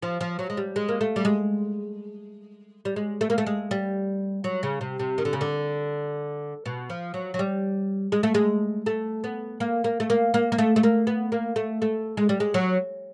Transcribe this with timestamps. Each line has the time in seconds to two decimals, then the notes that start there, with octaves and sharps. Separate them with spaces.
0.03 F3
0.21 F3
0.39 F#3
0.50 G#3
0.57 G3
0.76 G#3
0.88 A#3
1.01 A3
1.16 G3
1.25 G#3
2.85 G3
2.96 G#3
3.21 A3
3.30 A#3
3.38 A3
3.46 G#3
3.71 G3
4.44 F#3
4.63 C#3
4.81 C3
5.00 C3
5.18 D#3
5.25 D3
5.33 C#3
5.41 D3
6.66 B2
6.90 F3
7.14 F#3
7.34 F#3
7.39 G3
8.12 G#3
8.23 A3
8.34 G#3
8.86 A3
9.24 B3
9.60 A#3
9.84 A#3
10.00 A3
10.10 A#3
10.34 A#3
10.52 A#3
10.58 A3
10.76 A3
10.83 A#3
11.07 B3
11.32 A#3
11.56 A3
11.82 A3
12.17 G#3
12.29 G3
12.40 G#3
12.54 F#3